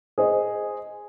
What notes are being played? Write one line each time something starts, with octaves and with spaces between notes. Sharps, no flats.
G#4 C5 D#5